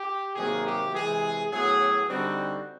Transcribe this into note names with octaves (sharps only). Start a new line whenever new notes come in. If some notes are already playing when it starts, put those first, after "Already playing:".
Already playing: G4
C3 D#3 F#3 A#3 G#4
G4
C3 E3 G#3 G#4
A2 F#3 B3 G#4
D3 G3 C4 D#4 F#4